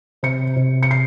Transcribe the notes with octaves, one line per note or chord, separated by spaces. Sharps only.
C3 C#7
C3
C#7
C7